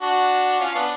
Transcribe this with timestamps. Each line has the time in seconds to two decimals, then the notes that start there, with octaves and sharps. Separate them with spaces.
0.02 D4 F#4
0.60 C#4 F4
0.75 B3 D4